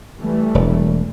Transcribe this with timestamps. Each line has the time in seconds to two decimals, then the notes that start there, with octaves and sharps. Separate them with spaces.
0.19 E3 G3 A3
0.55 E1